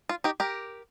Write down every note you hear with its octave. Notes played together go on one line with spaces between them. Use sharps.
F4
D#4 G4
G4 A#4